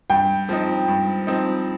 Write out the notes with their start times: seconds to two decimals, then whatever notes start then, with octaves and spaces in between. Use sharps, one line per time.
0.10 G2 G5
0.49 F3 C4 D#4
0.88 G2
1.27 F3 C4 D#4